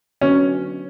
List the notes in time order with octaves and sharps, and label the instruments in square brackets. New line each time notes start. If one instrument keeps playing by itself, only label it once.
[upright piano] D3 F#3 B3 F#4 [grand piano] C#4